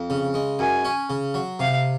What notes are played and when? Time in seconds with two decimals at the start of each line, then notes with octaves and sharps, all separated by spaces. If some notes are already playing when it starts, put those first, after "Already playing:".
Already playing: F2
0.10 C#3
0.34 G#3
0.59 F#2 G#5
0.85 C#4
1.10 C#3
1.34 F#3
1.59 C3 F5